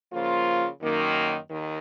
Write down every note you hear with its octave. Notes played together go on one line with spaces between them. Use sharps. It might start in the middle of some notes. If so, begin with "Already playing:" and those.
C#3 F3 A#3 F4
F#2 D#3 A#3
D#2 D#3